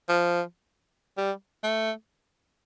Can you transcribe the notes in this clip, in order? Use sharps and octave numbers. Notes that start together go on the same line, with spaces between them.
F3
G3
A3